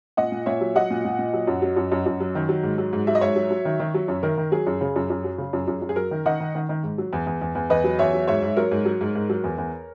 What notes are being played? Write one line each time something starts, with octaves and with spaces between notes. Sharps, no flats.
A#2 D#5 F#5
A#2
A#2 C#5 E5
F#3
F#3 D#5 F#5
A#2
A#2
A#2
F#3
F#2
F#3
F#2
F#2
F#2
F#3
D#3
F#3
G#2
F#3
G#2
F#3 E5
D#5
G#2 C#5 E5
F#3
F#3
D#3
D#3
F#3
F#2
D#3 A#4
D#3
F#3 G#4
F#2
C#3 G#4
F#2
F#2
F#3
C#3
F#2
F#2
F#2
G#4
F#3 A#4
D#3
D#3 D#5 F#5
D#3
D#3
D#3
G#2
F#3
E2
E2
E2
E2
E2 B4 D#5
F#3
E2 C#5 E5
F#3
G#2 C#5 E5
G#2
F#3 A#4 C#5
G#2
F#3
G#2
G#2
F#3
E2
E2